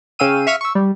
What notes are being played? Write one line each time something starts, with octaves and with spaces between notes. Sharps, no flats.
C#3 C#4 F5 G5 E6 D#7
E5 F5 C#6 F6 B6 D#7
C#6 E6
G3